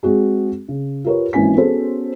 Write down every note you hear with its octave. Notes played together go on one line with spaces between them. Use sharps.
G#3 C4 F#4 G#4
C#3
F4 G4 A#4 B4 C#5
G#1 E3 A#3 C#4 G#5 B6
B3 C#4 F#4 G#4 A4 C5